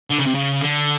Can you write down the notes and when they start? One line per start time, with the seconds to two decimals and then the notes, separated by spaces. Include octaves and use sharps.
0.11 D3
0.19 C#3
0.27 C3
0.35 C#3
0.62 D3